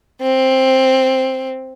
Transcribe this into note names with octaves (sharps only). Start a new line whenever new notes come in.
C4